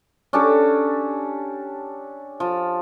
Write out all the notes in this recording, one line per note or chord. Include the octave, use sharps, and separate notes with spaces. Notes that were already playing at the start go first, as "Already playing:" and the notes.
C#4 D4 G4 A4
F3